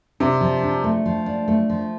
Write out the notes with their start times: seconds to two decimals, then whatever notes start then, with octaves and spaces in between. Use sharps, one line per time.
0.20 C3 D4
0.41 F3
0.63 D4
0.84 A3
1.06 F3
1.26 D4
1.48 A3
1.70 F3